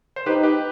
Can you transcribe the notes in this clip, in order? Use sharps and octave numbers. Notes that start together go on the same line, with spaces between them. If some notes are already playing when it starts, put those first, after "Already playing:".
C5
D#4 G4 B4
G4 B4